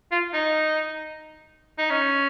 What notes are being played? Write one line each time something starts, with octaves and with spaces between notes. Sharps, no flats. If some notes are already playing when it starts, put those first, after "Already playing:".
F4
D#4
D#4
C#4